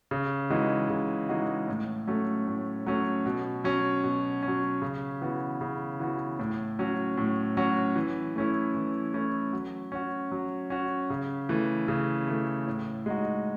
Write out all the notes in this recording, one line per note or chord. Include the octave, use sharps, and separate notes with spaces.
C#3
E3 G#3 D#4 F#4
C#3
E3 G#3 D#4 F#4
A2
F#3 A3 C#4
A2
F#3 A3 C#4
B2
F#3 C#4
B2
C#4
F#3
C#3
E3 B3 F#4
C#3
E3 B3 F#4
A2
F#3 C#4 F#4
A2
F#3 C#4 F#4
E3
A3 C#4 E4
E3
A3 C#4 E4
F#3
C#4 F#4
F#3
C#4 F#4
C#3
E3 A3
C#3
E3 A3
A2
G#3 D#4 F#4